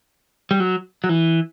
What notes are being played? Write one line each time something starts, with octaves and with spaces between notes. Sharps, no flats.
G3
F#3
F#3
E3